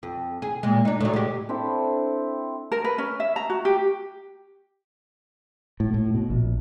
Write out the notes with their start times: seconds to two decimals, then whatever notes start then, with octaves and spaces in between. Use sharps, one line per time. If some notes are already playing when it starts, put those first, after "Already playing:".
0.03 F2
0.42 G#4
0.63 A#2 G#3
0.85 D4 D#4
1.00 A2 F#3
1.13 G#3 G4
1.49 C4 D4 E4 A4
2.72 A#4
2.84 B4
2.98 C#4
3.20 E5
3.36 A#5
3.50 F#4
3.65 G4
5.80 A2
5.94 A2
6.15 B2
6.30 A#1